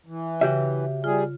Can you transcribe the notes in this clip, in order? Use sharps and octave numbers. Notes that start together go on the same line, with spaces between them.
E3
C#3 F#4 G4 E5
G3 F4 G#4